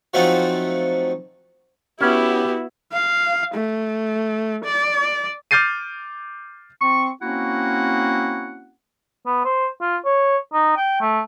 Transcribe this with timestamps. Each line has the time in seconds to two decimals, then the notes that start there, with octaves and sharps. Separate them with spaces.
0.14 F3 F#3 A3 C4 D#4 F#4
2.01 B3 C#4 E4 F#4 G4
2.93 F5
3.55 A3
4.65 D5
5.51 D6 F6 G6 A6 C7 D#7
6.81 C4 C#6
7.21 A#3 C4 C#4 E4 F#4 F#5
9.26 B3
9.45 C5
9.81 F4
10.05 C#5
10.53 D#4
10.77 G5
11.01 A3